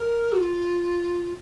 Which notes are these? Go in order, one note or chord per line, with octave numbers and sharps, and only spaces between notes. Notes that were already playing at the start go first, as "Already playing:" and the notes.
Already playing: A#4
F#4
F4